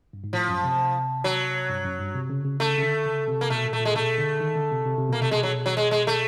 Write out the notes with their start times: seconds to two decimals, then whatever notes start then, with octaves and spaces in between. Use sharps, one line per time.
0.13 G2
0.24 G#2
0.33 A2 F3
0.48 F#2
0.64 C3
1.24 F#3
1.69 G2
1.84 F#2
1.99 G2
2.15 C3
2.30 C#3
2.45 C#3
2.60 C#3 A3
2.78 C#3
2.83 D3
3.06 C#3
3.28 C3
3.41 A#3
3.50 B2 A3
3.66 A#2
3.73 A3
3.80 A#2
3.85 G#3
3.96 B2 A3
4.18 D3
4.40 D#3
4.55 D3
4.72 C3
4.86 C3
4.98 C3
5.09 B2 A#3
5.21 C3 A3
5.31 B2 G#3
5.43 F#3
5.66 F#3
5.77 G#3
5.91 G#3
6.07 A3